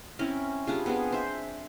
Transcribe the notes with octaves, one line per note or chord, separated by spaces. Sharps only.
C4 C#4 E4 A#4
G3 D4 F4 G#4
B3 C4 D4 G#4
C5 E5